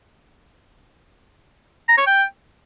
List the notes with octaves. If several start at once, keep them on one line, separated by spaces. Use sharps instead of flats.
A#5
C#5
G5